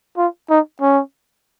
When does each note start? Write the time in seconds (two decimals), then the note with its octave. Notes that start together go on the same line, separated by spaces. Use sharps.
0.17 F4
0.50 D#4
0.81 C#4